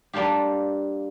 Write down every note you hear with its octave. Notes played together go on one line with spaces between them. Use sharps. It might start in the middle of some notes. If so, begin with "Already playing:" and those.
G3 A#3 D4 F4 G4